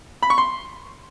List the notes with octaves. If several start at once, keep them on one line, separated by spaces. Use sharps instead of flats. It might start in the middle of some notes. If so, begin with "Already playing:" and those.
B5
C#6
C6